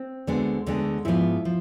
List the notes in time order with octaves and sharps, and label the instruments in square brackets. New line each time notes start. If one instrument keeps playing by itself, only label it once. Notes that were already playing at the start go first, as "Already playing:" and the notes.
Already playing: [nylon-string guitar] C4
D2 D3 G#3 B3
D2 D3 G#3 B3
G#2 F3 B3 E4
F3